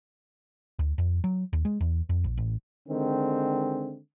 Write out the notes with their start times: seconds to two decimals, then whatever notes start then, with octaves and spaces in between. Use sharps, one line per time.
0.79 D2
0.98 F2
1.24 F#3
1.53 D#2
1.65 G#3
1.81 E2
2.09 F2
2.24 A#1
2.38 A1
2.89 D3 D#3 G#3 C4